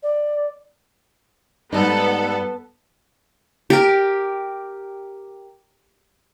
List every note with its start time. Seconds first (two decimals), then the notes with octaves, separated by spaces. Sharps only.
0.03 D5
1.72 G#2 G3 B3 D#4 A4
3.70 G4 A#4